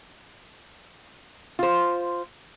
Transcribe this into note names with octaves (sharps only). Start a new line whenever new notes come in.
F4 C5